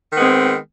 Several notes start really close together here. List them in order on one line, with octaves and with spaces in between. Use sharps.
D#3 B3 G#3 C4